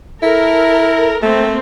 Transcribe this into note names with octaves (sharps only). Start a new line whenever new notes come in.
E4 A4 A#4
A3 A#3 C4